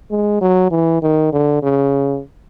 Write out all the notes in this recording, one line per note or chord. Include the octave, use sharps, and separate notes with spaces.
G#3
F#3
E3
D#3
D3
C#3